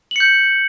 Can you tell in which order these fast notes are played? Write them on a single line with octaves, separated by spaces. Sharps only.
F#7 C#7 G6